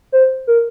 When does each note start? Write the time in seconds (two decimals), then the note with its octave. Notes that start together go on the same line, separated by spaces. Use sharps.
0.12 C5
0.47 A#4